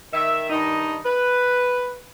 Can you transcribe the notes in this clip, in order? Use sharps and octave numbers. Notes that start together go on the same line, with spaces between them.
D#3 E5
G2 D#3 D#4
B4